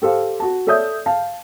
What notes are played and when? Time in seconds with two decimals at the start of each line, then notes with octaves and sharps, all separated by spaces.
0.02 G4 A4 C5 F5
0.40 F#4 A5
0.67 A4 C#5 D5 E5 D#6 G6
1.06 F5 A5